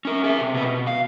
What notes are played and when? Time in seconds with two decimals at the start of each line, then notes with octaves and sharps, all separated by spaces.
0.05 C#4 A#4
0.24 G#4 E5
0.41 C3
0.54 B2 B4
0.66 B2
0.87 F5